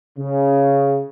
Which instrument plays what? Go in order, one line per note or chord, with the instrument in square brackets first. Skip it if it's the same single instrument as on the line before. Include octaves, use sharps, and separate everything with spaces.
[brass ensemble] C#3